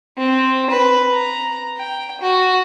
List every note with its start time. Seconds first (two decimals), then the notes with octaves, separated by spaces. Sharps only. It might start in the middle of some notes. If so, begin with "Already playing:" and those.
0.18 C4
0.70 B4
1.13 A#5
1.77 G5
2.21 F#4